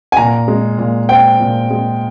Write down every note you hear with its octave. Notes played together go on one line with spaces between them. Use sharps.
G#5
A#2 A#5
G#3
A#2
C4 G5
A#2
G#3